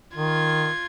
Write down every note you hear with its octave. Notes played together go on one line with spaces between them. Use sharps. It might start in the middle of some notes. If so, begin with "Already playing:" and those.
D#3 F4 G#6